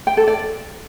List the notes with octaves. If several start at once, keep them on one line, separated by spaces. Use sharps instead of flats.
G5
A4
D5